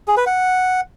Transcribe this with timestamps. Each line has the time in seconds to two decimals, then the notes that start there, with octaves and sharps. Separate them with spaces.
0.08 G#4
0.17 B4
0.26 F#5